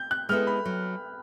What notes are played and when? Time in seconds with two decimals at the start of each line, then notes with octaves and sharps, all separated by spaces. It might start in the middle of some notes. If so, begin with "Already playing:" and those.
Already playing: G6
0.11 F#6
0.29 G#3 B3 E4 A4 F6
0.47 B5
0.65 F#3